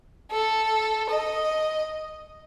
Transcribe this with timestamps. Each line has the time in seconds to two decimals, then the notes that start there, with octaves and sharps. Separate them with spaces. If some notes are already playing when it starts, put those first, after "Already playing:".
0.31 A4
1.10 D#5